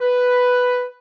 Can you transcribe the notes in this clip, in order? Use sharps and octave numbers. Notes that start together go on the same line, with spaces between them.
B4